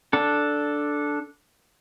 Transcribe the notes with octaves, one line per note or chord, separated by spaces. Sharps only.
D4 A4